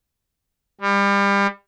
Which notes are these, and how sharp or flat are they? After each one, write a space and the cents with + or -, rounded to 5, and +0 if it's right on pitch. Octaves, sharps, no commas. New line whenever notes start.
G3 +30